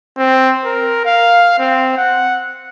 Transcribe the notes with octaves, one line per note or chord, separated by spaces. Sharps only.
C4
A#4
F5
C4
F#5